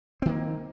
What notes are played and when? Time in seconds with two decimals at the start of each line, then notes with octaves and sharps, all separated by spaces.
0.22 C4
0.26 D#3
0.29 A#3